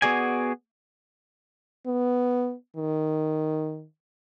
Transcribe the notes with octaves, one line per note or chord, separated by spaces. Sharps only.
B3 F#4 G#4 D5 G#5
B3
D#3